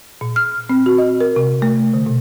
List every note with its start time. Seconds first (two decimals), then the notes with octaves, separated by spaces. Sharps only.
0.21 A#2
0.36 F6
0.70 C4
0.86 F#4
0.98 D#5
1.21 A#4
1.36 C3
1.62 A3
1.93 D3
2.06 B2